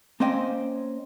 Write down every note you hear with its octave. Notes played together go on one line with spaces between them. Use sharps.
A#3 C4 C#4 C5 D#5 G5